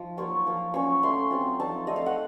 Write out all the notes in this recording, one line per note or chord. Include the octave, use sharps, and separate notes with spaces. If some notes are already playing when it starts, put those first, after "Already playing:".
Already playing: F3 D#4
F#3 A#3 F4 C#6
F3 A#3 F4
F#3 A#3 C#4 F4 C#6
A3 C#4 F4 C6
F#3 C4 F4
F3 C4 D#4 A5
A3 C4 D#4 D#5
F5
F#5